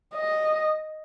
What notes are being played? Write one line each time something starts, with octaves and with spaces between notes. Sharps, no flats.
D#5